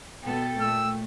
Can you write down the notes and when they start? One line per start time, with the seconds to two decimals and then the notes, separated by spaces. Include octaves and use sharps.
0.25 B2 B3 A4 G5
0.60 A#2 A3 E6